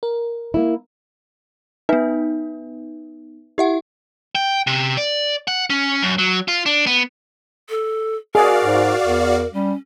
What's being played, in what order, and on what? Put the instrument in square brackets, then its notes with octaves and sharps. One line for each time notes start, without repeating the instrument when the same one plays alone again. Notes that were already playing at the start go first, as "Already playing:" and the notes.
[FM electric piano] A#4
[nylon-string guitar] A#3 E4
[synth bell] B3 D#4 [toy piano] B4 E5 G#5
[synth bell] E4 E5 F#5 [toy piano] G4
[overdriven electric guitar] G5
C3
D5
F#5
C#4
F#2
F#3
F4
D4
B3
[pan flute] A4
[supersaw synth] F#4 D5 F5 [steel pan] G#4 [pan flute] A#4
[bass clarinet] G#2
[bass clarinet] E2 [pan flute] A#4
[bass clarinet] G3 [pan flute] C#4